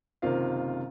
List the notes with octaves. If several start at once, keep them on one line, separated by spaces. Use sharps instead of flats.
F#1 C3 D#3 C4 F4 F5